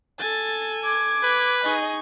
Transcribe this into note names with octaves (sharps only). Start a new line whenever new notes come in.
A4 G#5 A6
D6 G#6
B4
D#4 G#4 D#5 C#6